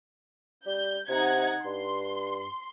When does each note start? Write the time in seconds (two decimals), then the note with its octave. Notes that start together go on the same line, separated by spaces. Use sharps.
0.66 G3 G6
1.09 C3 D#4 F#5 G#6
1.65 G2 C6